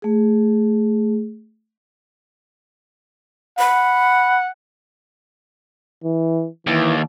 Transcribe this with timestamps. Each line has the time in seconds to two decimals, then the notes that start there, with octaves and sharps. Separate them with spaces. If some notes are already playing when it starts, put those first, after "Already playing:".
0.02 A3 G#4
3.59 F#5 B5
6.04 E3
6.67 D#2 E3